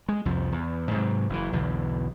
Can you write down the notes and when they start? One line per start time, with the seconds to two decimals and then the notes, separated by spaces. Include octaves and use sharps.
0.09 G#3
0.25 C2 F2 F3
0.52 E2
0.91 G#2 C3 F#3
1.29 F#1 A2 E3
1.53 B1 E2 D3 E3